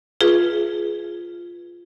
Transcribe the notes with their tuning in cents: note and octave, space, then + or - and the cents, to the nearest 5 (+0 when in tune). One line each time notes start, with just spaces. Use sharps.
F4 -5 G#4 +10 B4 +0